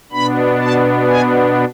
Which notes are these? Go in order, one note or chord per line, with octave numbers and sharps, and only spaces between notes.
B2 B3 D4 B5
A5
G#5